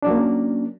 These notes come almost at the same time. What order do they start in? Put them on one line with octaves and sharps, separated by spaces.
D4 F#3 A#3 C#4